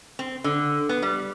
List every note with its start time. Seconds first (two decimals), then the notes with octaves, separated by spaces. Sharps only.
0.19 C4
0.44 D3
0.89 B3
1.02 G3